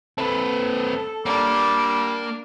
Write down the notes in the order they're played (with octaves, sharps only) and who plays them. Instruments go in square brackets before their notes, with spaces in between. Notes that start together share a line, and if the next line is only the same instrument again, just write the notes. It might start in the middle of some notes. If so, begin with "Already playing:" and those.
[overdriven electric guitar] C4 B4 [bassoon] A4
[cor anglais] G3 [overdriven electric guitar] A#3 [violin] D4